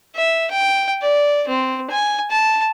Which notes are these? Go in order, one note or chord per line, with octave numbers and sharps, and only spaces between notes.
E5
G5
D5
C4
G#5
A5